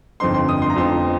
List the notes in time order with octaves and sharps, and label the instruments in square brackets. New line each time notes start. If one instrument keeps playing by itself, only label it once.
[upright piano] G1 F2 F3 C4 D#4 C6
C6
D#6
C6
A#5
G1 F2 F3 C4 D#4 C6